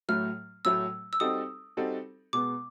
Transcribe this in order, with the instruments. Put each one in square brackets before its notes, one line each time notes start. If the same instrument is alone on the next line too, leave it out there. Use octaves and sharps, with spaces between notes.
[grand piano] A2 F#3 A3 [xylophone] F6
[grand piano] A2 F#3 A3 [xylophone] E6
[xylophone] E6
[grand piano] G3 C4 D#4 F#4 A4 [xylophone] D#6
[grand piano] G3 C4 D#4 F#4 A4
[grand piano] B2 G#3 B3 [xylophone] D6